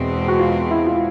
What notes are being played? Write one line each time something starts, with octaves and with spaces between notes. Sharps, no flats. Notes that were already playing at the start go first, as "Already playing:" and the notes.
Already playing: E2 B2 G#3 C4
F#4
F4
E4
F4